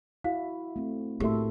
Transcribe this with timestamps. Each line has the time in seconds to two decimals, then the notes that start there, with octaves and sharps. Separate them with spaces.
0.24 E4 F#4 F5
0.76 A3 C4
1.20 A2 A#3 F#4 G4 A4 E5